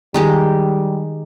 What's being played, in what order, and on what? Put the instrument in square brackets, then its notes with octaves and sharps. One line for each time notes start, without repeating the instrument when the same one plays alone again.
[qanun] D#3 G#3 G4 [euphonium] G3